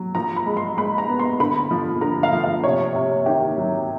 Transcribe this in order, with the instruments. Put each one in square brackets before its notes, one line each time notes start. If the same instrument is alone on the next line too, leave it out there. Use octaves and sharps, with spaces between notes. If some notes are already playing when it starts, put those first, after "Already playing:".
Already playing: [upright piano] F#3
F3 A#5
B5
G#3
C6
G#3 B5
A#5
B3
C6
D3 B5
F3
D3 A#5
F5
F3
F5
C3 C#5
C3
D#3 G4
F#3